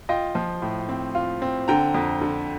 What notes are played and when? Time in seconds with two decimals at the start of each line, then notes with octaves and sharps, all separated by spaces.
0.09 F4 D#5 G5
0.35 F3
0.62 A2
0.89 C4
1.15 F4
1.42 C4
1.68 D3 G5 A#5
1.94 F2
2.21 D3